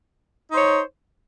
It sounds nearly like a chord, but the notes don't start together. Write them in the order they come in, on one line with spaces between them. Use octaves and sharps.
D#4 C5 C#5